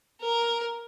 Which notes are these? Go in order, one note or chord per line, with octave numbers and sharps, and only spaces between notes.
A#4